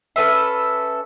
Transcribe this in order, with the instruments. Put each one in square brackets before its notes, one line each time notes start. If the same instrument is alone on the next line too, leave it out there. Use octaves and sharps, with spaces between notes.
[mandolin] C#4 A4 B4 E5